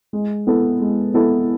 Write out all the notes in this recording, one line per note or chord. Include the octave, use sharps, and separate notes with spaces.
G#3
B3 E4 A4
G#3
B3 E4 A4